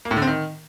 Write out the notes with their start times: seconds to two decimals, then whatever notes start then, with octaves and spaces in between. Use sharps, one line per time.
0.05 A#3
0.11 A2
0.16 D3
0.22 C4
0.27 D#3